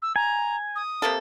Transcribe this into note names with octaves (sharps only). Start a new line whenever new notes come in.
E6
G#5 A#5
D#6
C3 A#3 A4